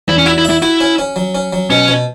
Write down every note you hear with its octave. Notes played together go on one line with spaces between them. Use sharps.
E2 E4
C#4
E4 F#4
E4
E5
E4
E4 F#4
C#4
C#4
F#3
C#4
F#3
B2 C#4
B2